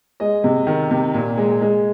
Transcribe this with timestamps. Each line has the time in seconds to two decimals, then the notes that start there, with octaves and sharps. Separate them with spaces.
0.20 G#3 D#5
0.44 C3
0.67 D#3
0.91 C3
1.14 A#2
1.38 G#3
1.62 G#3